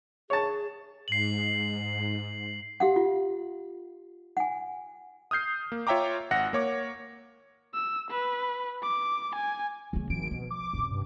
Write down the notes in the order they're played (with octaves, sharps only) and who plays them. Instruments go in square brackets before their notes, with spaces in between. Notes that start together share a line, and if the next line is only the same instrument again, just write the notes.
[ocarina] G#4 [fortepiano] C#5 A5
[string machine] G#2 [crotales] C7 F#7
[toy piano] G4 F5 F#5
F4
F#5 G#5
[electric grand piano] D#6 F6 G6 C7
A#3
F4 C#5 E5 G5 A#5 D6
G#1 F#5 A#6
A#3 C#5 D6
[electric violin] E6
B4
D6
G#5
[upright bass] C#3 A3
[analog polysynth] G#1 D7 [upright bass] F3
[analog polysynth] B2 [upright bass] F3
[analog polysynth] D6
[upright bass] F#2 C3
[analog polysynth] G2